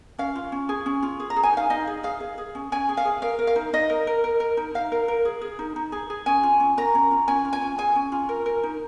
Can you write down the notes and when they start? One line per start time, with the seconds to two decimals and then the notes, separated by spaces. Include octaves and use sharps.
0.19 C#4 F5
0.35 F4
0.52 C#4
0.69 G#4
0.86 C#4
1.03 F4
1.20 G#4
1.30 A#5
1.36 G#4
1.43 G#5
1.53 D#4 F5
1.70 D#4 D#5
1.87 G#4
2.03 G#4 F5
2.20 G#4
2.38 G#4
2.55 C#4
2.72 C#4 G#5
2.89 G#4
2.97 F5
3.05 G#4
3.22 A#4 F5
3.39 A#4
3.47 F5
3.56 D#4
3.73 D#4 D#5
3.90 A#4
4.07 A#4
4.24 A#4
4.40 A#4
4.57 D#4
4.75 D#4 F5
4.92 A#4
5.08 A#4
5.25 G#4
5.41 G#4
5.59 D#4
5.76 D#4
5.92 G#4
6.10 G#4
6.26 C#4 G#5
6.43 F4
6.60 C#4
6.77 A#4 A#5
6.95 C#4
7.11 F4
7.28 C#4 G#5
7.45 F4
7.53 G#5
7.62 C#4
7.78 G#4 G#5
7.95 C#4
8.12 F4
8.29 A#4
8.46 A#4
8.63 D#4